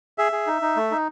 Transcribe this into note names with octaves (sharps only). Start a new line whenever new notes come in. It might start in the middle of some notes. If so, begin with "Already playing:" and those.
G#4 E5
G#4
D#4
D#4
A3
D#4